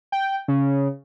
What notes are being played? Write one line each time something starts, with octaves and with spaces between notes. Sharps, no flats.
G5
C#3